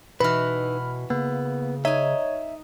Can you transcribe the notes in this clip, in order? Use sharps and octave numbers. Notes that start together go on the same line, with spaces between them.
B2 E3 D#4 E4 F#4 B4 B5 F6
C#3 A#3 B3
D#4 C#5 E5 G#5